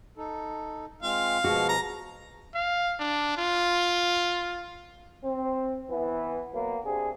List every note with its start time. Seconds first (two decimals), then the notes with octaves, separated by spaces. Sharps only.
0.17 D#4 A4
1.02 G#3 C4 F4 F5
1.44 B2 F3 G#3 F#4
1.69 A#5
2.55 F5
3.00 D4
3.38 F4
5.24 C4
5.90 E3 B3
6.52 F#3 A#3 B3
6.84 C3 C4 D4 G#4